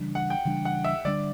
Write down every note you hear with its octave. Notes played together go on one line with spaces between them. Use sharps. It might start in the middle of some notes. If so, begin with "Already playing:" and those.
Already playing: C#3 E3 G3 D4
F#5
G5
C#3 E3 G3 D4
F#5
E5
D3 G3 D4 D5